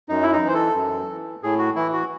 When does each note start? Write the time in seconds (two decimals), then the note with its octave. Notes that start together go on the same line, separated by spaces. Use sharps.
0.09 F#2 D#4
0.22 E4
0.32 D#4
0.43 E3
0.48 C5
0.54 A4
0.76 F#2
1.09 E3
1.43 A2 G#4
1.59 F#4
1.76 E3 E4
1.93 F#4